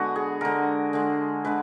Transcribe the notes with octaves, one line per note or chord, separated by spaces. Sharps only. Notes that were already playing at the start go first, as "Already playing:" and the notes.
Already playing: D3 G#3 B3 F#4
G#4
D3 G#3 A#4
D3 G#3
D3 G#3 B4